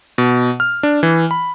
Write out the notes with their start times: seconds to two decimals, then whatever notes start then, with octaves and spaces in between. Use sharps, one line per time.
0.18 B2
0.60 F6
0.83 D4
1.03 E3
1.31 B5